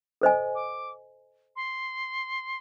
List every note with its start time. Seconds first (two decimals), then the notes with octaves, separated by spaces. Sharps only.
0.21 A4 C5 D#5 G#5
0.55 D6
1.56 C6